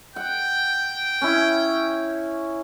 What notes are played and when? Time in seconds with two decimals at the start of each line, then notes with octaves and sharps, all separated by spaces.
0.16 F#5 G5
1.21 C#4 E4